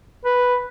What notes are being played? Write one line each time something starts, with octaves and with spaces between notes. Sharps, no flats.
B4